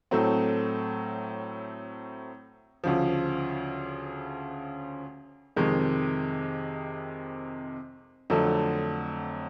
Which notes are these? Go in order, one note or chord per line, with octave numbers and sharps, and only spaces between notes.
A2 F#3 A3 C4
D2 C#3 F3
F2 C3 D#3 G#3
F2 D3 F#3 A3